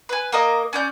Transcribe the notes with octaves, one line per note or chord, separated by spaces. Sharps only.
B4 G#5
A#3 A#4 D#5
C#4 D5 G6